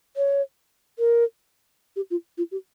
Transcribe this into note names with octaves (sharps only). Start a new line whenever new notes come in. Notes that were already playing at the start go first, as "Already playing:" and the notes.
C#5
A#4
G4
F4
F4
G4